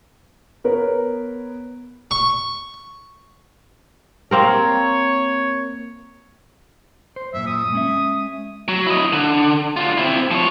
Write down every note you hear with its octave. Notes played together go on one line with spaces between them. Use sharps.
B3 A#4 B4 C#5
C#6
A#3 C4 A#4 C#5
C5
F#2 A#2 E5
D#6
G#3 C#4 E5
F#3
E4 D#5
D3
D3 F4
C4 E4
F3 C#5